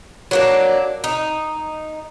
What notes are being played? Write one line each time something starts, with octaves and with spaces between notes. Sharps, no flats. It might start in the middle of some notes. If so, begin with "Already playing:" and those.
F#3 A#3 D4
D#4